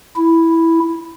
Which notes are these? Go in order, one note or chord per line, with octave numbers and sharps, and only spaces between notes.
E4